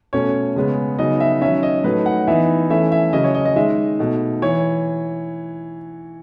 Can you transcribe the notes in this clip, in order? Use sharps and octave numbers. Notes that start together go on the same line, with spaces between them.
B2 A3 C#4 C#5
C#3 G#3 B3
C#3 F#3 B3 D#4 D#5
E5
D#3 F#3 C#4 E5
D#5
A2 F#3 A3 D#4 B4
F#5
E3 B3 D#4 E5
E3 A3 C#4 E5
E5
C#3 F#3 C#4 D#5
C#5
D#5
D#5
D#3 G#3 D#4 E5
B2 A3 D#4
E3 C#5